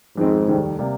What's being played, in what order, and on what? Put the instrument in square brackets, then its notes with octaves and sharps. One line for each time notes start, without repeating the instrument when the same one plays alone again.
[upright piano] F2 D#3 G#3 C4 [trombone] G#2
[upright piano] F1 D#2 D#3 G3
C3 G3 A#3